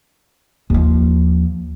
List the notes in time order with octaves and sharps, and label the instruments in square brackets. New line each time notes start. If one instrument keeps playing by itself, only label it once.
[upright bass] D#2 F3